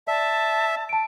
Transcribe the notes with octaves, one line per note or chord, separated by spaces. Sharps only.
D5 E5 A5
A5 D7